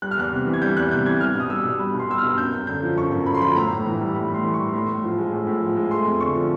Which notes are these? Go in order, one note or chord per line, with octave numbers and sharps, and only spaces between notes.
G3 F#6
F6
E2 F#6
C3
E3
G#6
G3 G6
E2 F#6
C3 G6
E3 G#6
G3 F6
B2 D#6
G3 E6
B2
G3 B5
B2
C6
G3 E6
F6
B2
F#2 G6
F#2
D3 G6
F3
F#2 C#6
F#2
D3 B5
C6
F3 B5
A2 A#5
A2
E3
G3
A2 B5
A2
C6
E3
C#6
G3
A2 C6
A2
F3
G#3
A2
A2
F3
G#3
A3 C6
F2
D3 C#6
F3